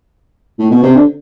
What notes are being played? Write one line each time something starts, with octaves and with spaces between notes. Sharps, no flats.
A2
B2
C3
D3